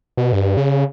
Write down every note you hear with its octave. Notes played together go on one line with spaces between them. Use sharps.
B2
G2
C#3